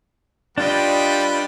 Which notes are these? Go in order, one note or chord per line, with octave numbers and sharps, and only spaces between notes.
G3 D4 F4 B4 D#5 G5